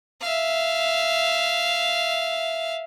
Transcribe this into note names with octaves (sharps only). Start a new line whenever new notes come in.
E5 F5